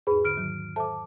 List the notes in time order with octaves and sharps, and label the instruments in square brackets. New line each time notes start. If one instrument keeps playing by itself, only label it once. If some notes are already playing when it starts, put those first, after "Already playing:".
[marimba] E2 G#2 D#4 [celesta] G#4 B4 B5
[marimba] D3 [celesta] F6 D7
[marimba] G#2 D#3 F#3
[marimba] A4 C5 E5 [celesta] A5 D6